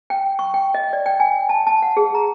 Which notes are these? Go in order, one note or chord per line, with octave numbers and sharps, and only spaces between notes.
G5
C#6
G5
D#5
D5
G5
G#5
A5
A5
F#5
G#4
A#5